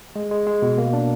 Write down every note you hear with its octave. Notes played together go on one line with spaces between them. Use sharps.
G#3
G#3
G#3
B2
A#3
D4